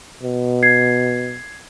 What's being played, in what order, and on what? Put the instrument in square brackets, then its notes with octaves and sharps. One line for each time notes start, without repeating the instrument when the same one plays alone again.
[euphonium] B2
[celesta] G#6 C7